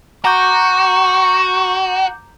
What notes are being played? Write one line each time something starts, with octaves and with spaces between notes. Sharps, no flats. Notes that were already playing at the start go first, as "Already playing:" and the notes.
F#4 A#5 C#6 D6 G6